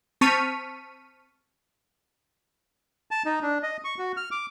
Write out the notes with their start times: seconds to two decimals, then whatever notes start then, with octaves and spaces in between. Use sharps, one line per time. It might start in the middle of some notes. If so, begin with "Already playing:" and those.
0.21 C4 A5 C#6 F6 B6 D#7
3.11 A5
3.26 D#4
3.43 D4
3.63 D#5
3.84 C#6
3.99 F#4
4.17 F6
4.31 D6